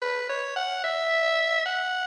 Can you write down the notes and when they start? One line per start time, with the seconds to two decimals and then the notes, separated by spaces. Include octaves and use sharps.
0.02 B4
0.29 C#5
0.56 F#5
0.84 E5
1.66 F#5